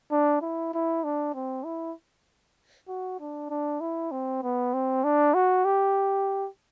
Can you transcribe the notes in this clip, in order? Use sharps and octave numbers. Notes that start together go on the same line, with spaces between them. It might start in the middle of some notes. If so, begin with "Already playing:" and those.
D4
E4
E4
D4
C4
E4
F#4
D4
D4
E4
C4
B3
C4
D4
F#4
G4